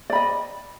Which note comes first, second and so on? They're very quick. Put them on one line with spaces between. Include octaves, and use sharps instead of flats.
D5 B5 D#5